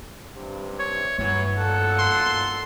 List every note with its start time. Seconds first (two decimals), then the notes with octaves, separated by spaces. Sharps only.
0.35 G2 C3
0.79 C#5
1.18 G2 E3 F#3 C#5
1.57 B1 A#2 A4 F#5
1.99 C6